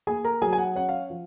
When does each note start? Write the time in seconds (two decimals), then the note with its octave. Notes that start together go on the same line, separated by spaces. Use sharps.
0.07 A#3 G#4 G#5
0.25 A#4 A#5
0.42 F#3 G#4 G#5
0.53 G#5
0.58 F#5
0.76 C#4 F#5
0.89 F5
1.10 F3